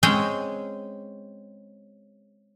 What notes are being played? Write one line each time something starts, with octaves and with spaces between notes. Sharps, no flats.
G#3 C4 C#4 G#4 G5